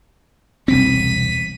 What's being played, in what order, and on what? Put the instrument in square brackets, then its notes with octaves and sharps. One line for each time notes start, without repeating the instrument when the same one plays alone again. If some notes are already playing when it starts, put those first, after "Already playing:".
[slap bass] E1 C2 C4 [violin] B6 D#7